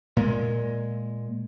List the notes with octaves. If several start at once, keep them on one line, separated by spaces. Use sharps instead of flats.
A#2 G#3